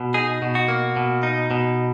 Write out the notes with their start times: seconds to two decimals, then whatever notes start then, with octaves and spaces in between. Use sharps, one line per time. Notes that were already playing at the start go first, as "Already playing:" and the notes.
Already playing: B2
0.14 D#4 G#4
0.42 B2
0.55 F#4
0.68 A#3
0.96 B2
1.23 D#4
1.51 B2